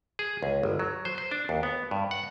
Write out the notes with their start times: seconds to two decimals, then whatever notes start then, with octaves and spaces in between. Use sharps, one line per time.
0.19 G#4
0.43 C#2
0.63 G1
0.79 F#3
1.05 C5
1.18 C5
1.31 D4
1.49 D#2
1.63 B3
1.91 G2
2.11 F#5